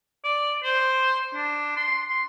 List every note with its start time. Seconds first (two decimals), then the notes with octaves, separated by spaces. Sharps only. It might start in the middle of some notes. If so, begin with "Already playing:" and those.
0.24 D5
0.64 C5
1.34 D4
1.76 C6
2.08 C6